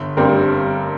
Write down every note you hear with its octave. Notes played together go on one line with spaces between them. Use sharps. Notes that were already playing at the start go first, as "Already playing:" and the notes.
Already playing: G1
G2 G3 C4 A#4